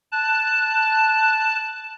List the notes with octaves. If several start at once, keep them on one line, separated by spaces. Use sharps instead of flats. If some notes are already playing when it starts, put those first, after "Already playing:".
A5 F#6